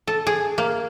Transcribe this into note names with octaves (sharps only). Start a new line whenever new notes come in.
A4
G#4
A#3